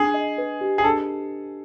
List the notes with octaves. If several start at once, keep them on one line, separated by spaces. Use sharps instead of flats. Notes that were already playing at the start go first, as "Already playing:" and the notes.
Already playing: D4 G#4
D#5
B4
G4
G#4
D4 A4